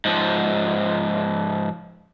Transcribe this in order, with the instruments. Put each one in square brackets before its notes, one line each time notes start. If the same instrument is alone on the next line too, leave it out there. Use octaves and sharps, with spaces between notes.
[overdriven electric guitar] G#2 F3